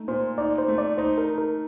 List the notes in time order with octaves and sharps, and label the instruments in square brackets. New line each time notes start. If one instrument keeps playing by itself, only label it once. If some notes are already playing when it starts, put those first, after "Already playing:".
Already playing: [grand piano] A3 D#4
[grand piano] A#2 [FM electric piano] C5
[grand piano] D#4 [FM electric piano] D5
[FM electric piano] C5
[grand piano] A3
[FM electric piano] D5
[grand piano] D#4 [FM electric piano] C5
[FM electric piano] A#4
[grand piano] D#4
[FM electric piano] A#4